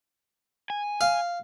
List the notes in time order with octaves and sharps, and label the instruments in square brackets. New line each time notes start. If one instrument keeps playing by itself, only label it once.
[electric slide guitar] G#5
[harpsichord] F5